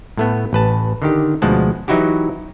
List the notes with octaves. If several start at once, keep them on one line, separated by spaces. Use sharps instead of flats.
A2 A3 B3
A1 B4 A5
D3 D#3 G4
D2 B2 F3 G#3 F#5 A5
E3 F#3 D#4 E4 F#4 G4